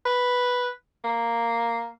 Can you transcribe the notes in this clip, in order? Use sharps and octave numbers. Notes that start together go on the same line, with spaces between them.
B4
A#3